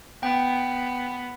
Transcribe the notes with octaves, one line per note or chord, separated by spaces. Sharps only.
B3 G5